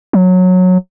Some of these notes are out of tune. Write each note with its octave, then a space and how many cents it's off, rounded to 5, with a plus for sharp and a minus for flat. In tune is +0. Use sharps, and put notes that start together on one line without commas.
F#3 -15